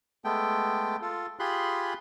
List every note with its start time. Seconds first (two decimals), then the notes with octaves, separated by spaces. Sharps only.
0.25 G#3 A3 B3 G5
1.02 F4 A4
1.39 F4 G4 G#4 B5 C6 F#6